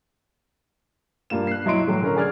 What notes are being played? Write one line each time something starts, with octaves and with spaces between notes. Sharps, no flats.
G2 A#3 F4 E7
F#6 C7
F#3 E4 D#5 C6 D7
A2 E3 F#3
D3 C#4 A#4
G#4 D5 F6 G#6